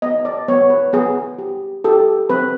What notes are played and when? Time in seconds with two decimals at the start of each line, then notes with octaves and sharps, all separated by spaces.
0.02 B3 D#5
0.25 D5
0.48 B3 C#5
0.70 B4
0.93 B3 G#4
1.39 G4
1.84 G4 A4
2.30 C4 B4